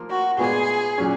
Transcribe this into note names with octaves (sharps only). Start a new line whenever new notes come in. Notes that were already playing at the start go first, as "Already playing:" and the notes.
Already playing: F3 A#3 F4 A#4
F#4
A#2 G#3 B3 F4 G#4
A#2 F#3 C#4